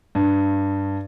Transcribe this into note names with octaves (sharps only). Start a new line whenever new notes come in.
G2